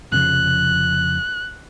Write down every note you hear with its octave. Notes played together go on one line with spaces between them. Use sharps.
F1 C#3 F3 F#6